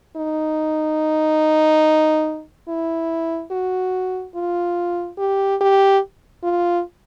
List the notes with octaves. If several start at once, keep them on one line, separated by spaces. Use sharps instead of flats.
D#4
E4
F#4
F4
G4
G4
F4